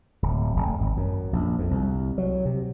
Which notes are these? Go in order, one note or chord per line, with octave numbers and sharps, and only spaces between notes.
D1
F1
G#1
F#2
A#1
F2
C2
F#3
C3